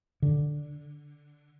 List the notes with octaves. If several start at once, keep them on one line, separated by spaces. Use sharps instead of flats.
D3